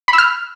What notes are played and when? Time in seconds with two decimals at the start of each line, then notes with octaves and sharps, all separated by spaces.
0.08 B5
0.13 E6
0.18 F6